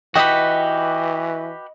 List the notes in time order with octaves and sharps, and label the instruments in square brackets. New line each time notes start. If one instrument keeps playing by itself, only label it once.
[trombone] E3 [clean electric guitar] F#4 G4 B4 [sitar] D#5 [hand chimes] G5